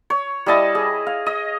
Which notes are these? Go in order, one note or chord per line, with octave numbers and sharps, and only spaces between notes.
C#5
G3 E4 D#5 A5
G#4
F5
D#5